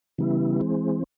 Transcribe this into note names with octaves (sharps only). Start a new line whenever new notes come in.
C#3 E3 G3 B3 E4
E3 G#3 C4